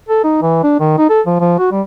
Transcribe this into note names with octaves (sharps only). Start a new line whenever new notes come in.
A4
D#4
E3
D4
D#3
D#4
A4
F3
F3
F#4
G3